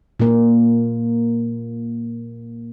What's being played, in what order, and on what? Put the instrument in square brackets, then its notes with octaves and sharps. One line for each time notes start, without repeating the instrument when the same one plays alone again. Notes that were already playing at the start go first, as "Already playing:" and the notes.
[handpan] A#2 A#3